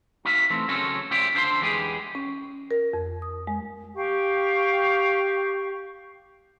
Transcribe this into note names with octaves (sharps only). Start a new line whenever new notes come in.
D#4 F#4 E5 F5
E3 A3 C4
C#3 F#3 C#4 A4 A#4 C5
C#4 F4 C5 D5 E5 G5
D3 D4 C5 F5 A5 C6
E2 E3 G#3 G4 G#4
C#4
A#4
F2
D#6
G#3
G4 F5 G5 C#6